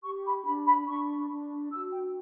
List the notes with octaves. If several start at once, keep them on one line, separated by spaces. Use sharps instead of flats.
G4 C#6
B5
D4 B5
B5
D4 C#6
D4
F#4 E6
G5